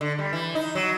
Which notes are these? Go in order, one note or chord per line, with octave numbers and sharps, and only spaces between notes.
D3
G3
E3
D#4
F#3